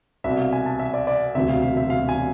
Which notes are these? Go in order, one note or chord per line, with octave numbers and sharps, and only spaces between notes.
C2 B2 E5
F5
G#5
A5
E5
D5
D5
E1 D2 C3 E5
F5
F5
E5
F5
G#5